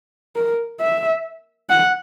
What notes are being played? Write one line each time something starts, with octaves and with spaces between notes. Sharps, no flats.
A#4
E5
F#5